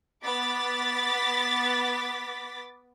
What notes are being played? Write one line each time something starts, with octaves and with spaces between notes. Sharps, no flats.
B3 D6 A6 B6